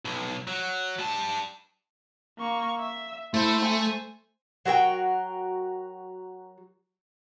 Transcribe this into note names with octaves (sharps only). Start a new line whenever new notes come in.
B1
F#3
G3 A5
A#3 C#6
E5
A3 E4 C5
C5 G#5
F#3 F#4 A#4 G5